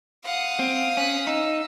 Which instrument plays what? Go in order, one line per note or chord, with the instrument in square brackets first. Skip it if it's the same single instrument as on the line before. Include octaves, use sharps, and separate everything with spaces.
[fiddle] F5 D#6 [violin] F#5
[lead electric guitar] C4
[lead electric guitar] C#4 [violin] F#6 B6
[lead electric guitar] D#4 [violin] E6